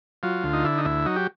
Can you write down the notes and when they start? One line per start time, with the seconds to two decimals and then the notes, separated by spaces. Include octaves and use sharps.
0.23 F#3 F4
0.44 D2
0.53 D#4
0.65 D3 E4
0.78 D#4
0.85 D2 E4
1.06 F#3 D#4
1.16 G4